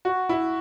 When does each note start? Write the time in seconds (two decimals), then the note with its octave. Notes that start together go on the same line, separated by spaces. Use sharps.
0.05 F#4
0.29 E4